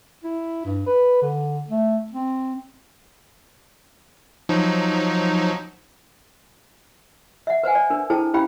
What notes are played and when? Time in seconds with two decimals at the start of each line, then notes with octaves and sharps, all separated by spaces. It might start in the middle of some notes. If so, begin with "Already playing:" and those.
0.24 E4
0.65 G2
0.86 B4
1.22 D3
1.70 A3
2.12 C4
4.49 F3 F#3 D#4
7.47 E5 F#5
7.63 B4 C5 F#5 G#5
7.75 D5
7.90 D4 A#4
8.10 E4 G#4 A4 C5 G5 A5
8.34 C#4 E4 G4 F5 G5 B5